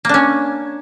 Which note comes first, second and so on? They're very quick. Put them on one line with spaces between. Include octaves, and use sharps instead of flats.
A#3 D4 C#4